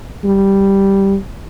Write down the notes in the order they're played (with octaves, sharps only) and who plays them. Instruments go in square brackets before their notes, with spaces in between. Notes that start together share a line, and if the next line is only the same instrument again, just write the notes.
[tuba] G3